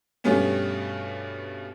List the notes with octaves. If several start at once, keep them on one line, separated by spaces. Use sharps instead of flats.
G2 B2 G3 A3 B3 C#4